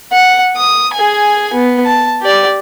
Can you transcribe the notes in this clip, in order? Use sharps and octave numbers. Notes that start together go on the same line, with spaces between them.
F#5
D#6
G#4 G#5
B3
A5
G4 D5